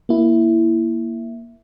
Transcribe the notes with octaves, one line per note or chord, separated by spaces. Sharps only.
A#3 E4